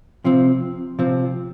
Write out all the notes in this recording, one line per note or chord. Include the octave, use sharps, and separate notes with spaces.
C3 F3 C4
C3 F3 C4